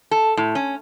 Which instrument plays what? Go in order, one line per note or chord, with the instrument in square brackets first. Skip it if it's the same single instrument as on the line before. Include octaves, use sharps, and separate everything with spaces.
[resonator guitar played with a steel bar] A4
A2
C#4